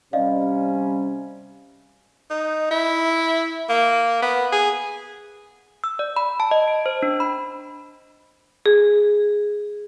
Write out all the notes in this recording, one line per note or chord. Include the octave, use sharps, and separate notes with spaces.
C3 G3 C#4 D5 D#5 F5
D#4
E4
A#3
B3
G#4
E6
D5
B5
A5
D#5
D7
C5
D4
B5
G#4